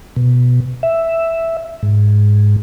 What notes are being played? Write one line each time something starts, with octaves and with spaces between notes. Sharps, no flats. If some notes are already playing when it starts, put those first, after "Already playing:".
B2
E5
G#2